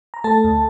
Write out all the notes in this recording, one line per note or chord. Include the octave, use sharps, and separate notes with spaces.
A#5
A3 A4 A5
D2